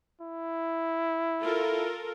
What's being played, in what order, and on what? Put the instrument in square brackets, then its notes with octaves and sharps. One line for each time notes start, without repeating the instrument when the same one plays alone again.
[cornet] E4
[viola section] F4 A4 A#4